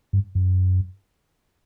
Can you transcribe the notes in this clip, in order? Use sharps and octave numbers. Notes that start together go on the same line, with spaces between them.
G2
F#2